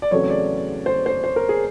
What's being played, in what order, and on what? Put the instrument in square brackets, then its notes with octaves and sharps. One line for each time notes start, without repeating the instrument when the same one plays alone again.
[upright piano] D5
E2 C#3 F#3 A3 C4 C#5
D5
C5
C5
C5
A#4
G#4